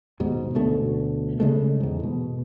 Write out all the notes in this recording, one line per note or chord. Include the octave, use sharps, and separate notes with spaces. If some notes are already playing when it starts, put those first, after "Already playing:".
D#2 G#2 B2
D2 B2 A3 C#4
C#3 G#3 A3
E2 G#2
B2